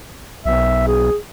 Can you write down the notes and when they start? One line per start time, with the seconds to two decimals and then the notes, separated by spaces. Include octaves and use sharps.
0.46 B1 E5
0.87 G#4